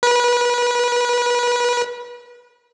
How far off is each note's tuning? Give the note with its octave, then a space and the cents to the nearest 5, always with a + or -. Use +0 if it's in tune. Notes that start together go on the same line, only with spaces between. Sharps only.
B4 -30